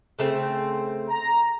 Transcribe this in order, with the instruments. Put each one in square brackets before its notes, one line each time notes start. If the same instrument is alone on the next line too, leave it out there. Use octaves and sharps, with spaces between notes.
[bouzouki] C#3 A3 C4
[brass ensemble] A#5